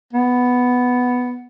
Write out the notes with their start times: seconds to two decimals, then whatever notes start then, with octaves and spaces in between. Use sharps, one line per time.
0.13 B3